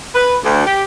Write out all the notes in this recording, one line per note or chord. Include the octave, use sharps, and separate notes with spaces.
B4
D2
G4